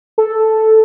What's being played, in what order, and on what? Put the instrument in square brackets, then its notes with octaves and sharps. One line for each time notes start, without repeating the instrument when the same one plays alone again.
[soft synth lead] A4